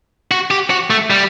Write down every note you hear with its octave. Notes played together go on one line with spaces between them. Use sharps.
F#4
G4
F#4
A3
G3